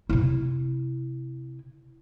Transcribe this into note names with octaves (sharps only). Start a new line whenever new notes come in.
C3 E4